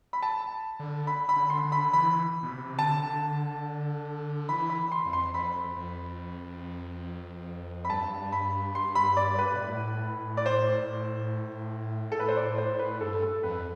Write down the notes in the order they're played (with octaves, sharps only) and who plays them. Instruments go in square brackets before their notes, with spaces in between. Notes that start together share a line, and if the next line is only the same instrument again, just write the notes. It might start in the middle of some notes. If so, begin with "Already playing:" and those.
[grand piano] B5
A5
[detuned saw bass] D3
[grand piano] B5
B5
[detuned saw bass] D3
[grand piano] C6
[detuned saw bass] D3
[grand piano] B5
[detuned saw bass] E3 [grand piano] B5
[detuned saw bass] B2
C3
[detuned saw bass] D3 [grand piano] A5
[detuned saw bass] E3 [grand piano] B5
[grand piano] B5
C6
[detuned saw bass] F2
[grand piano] C6
[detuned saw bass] F2 [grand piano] B5
[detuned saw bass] F2
[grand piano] B5
[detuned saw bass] G2 [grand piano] A5
[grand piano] B5
C6
B5
D5
B4
[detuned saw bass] B2
A2
[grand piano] D5
C5
A4
B4
C5
D5
C5
B4
[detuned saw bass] G2 [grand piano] A4
[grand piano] A4
[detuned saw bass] F2 [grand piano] B4